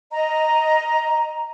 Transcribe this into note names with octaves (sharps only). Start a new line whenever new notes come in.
D#5 A#5